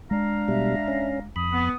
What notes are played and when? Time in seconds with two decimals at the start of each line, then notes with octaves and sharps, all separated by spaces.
0.11 G#3 D4 F5 A#5
0.48 B2 G3 E5
0.88 C#4
1.36 F2 B5 D#6
1.52 B3